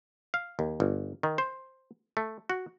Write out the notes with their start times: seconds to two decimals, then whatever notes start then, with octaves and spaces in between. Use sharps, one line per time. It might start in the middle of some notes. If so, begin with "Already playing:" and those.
0.34 F5
0.59 D#2
0.80 G1
1.23 D#3
1.38 C5
2.17 A3
2.50 F#4